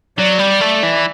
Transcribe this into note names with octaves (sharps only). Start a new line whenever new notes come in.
F#3 D5
G3
A3
E3